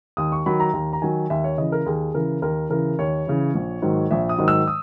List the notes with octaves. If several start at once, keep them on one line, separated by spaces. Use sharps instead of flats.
D#2 D#6
C#6
D#3 F#3 B5
A#5
D#2 A#5
A#5
D#3 F#3 G#5
D#2 E5
C#5
C#3 E3 D#5
A#4
D#2 G#4
C#3 E3 A#4
D#2 A#4
C#3 E3 A#4
D#2 C#5
C#3 E3
A#1
G#2 D#3 F#3
A#1 E5
D#6
G#2 D#3 F#3
E6
D#6